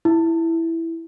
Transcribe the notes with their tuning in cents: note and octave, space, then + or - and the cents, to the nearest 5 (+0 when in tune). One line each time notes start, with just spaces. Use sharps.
E4 +0